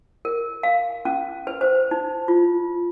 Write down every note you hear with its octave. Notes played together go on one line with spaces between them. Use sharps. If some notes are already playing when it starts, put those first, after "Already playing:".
A#4
F5
C#4
B4
C5
D#4
F4